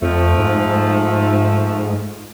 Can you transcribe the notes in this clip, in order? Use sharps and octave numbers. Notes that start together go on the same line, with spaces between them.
F2 F3 A3
G#2